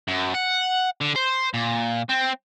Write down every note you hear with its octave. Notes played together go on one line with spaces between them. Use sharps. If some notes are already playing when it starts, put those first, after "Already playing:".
F#2
F#5
D3
C5
A#2
C4